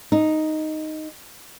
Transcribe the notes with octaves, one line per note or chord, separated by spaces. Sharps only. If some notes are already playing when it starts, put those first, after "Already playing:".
D#4